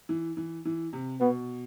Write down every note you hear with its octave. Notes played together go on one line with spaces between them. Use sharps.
E3
E3
E3
C3
B2 B3